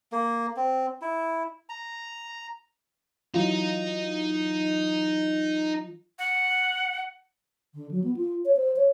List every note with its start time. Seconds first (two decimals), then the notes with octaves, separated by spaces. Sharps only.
0.12 A#3
0.56 C4
1.02 E4
1.69 A#5
3.34 E3 F#3 D#4 F4
6.19 F#5
7.75 D3
7.91 F#3
8.04 B3
8.17 F4
8.45 C#5
8.56 C5
8.76 C#5